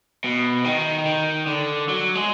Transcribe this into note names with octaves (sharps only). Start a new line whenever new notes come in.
B2
D#3
D#3
D3
F#3
G#3